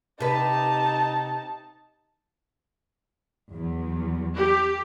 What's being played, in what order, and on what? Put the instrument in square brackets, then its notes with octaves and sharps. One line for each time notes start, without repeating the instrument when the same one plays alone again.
[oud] C3 B4 [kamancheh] D#4 A5
[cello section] E2 F#3
[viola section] G4